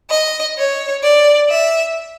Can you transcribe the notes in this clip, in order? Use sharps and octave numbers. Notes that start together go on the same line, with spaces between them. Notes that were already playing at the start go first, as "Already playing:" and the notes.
D#5
C#5
D5
E5